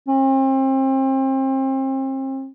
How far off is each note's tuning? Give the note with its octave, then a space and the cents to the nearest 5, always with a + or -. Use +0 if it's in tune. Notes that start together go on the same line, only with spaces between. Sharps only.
C4 +35